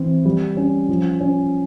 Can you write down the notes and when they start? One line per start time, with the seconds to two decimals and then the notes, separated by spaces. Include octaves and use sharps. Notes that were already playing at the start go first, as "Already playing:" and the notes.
Already playing: E3 C4
0.25 G3
0.57 C#4
0.89 F3
1.21 C#4